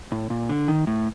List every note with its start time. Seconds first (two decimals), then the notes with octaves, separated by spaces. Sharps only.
0.12 A2
0.30 A#2
0.49 D3
0.68 D#3
0.87 A2